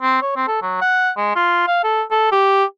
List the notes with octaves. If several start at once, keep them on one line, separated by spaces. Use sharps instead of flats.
C4
C#5
C4
A4
F#3
F#5
G#3
F4
F5
A4
A4
G4